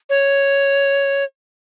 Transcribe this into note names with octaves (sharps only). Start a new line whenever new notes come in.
C#5